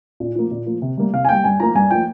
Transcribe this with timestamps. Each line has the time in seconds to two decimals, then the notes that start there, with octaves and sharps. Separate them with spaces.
0.20 A#2
0.35 F3 A#3
0.51 A#2
0.66 F3 A#3
0.82 C3
0.98 G3 A#3
1.13 C3 F5
1.25 G#5
1.29 G3 A#3 G5
1.44 G2 G#5
1.60 F3 A#3 A#5
1.75 G2 G#5
1.91 F3 A#3 G5